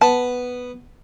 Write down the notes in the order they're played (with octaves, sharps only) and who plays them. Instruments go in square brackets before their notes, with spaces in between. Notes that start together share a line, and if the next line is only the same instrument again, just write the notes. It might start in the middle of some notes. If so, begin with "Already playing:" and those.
[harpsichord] B3 [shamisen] A5